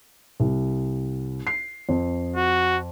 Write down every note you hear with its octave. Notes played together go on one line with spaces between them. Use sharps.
C2
C7
F2
F#4